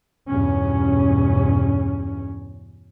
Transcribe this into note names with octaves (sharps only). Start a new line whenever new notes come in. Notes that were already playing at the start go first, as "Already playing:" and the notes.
E2 G2 B2 C#4